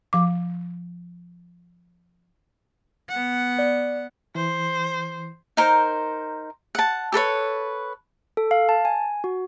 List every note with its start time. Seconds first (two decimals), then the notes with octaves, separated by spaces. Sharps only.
0.13 F3 D6
3.09 B3 F#5
3.59 D5
4.35 E3 C5
5.57 D#4 A#4 C5
6.75 F#5 A5
7.12 G4 A4 B4 C#5
8.37 A4
8.51 F5
8.69 A5
8.85 G#5
9.24 F#4